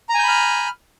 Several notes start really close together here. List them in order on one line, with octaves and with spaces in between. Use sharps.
A#5 G#5 G6 B5 F6